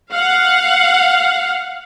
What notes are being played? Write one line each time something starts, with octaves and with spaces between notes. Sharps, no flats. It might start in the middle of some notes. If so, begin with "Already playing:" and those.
F5 F#5